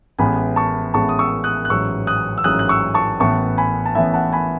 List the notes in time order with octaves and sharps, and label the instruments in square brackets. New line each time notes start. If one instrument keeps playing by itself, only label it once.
[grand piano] A1 A2 G#3 B3 G#5 B5
A5 C#6
A1 A2 G#3 B3 A5 C#6
D#6
C#6 E6
D#6 F#6
F#6
A1 G#2 F#3 C#6 E6
D#6 F#6
E6
A1 G#2 F#3 D#6 F#6
F#6
C#6 E6
A5 C#6
A1 A2 E3 B3 A5 C#6
G#5 B5
A5
A1 A2 E3 B3 E5 G#5
F#5 A5
G#5 B5